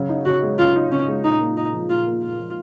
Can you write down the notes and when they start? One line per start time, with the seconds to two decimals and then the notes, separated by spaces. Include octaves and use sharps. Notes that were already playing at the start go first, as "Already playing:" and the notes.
Already playing: C#3 F#3
0.09 D#4
0.25 C#3 F#4
0.43 G#3
0.59 C#3 F4
0.76 D#4
0.91 C#3 C#4
1.08 G#3
1.24 A#2 D#4
1.40 A#3
1.57 A#2 D#4
1.73 F3
1.89 A#2 F4
2.07 A#3
2.22 A#2 F4
2.38 F3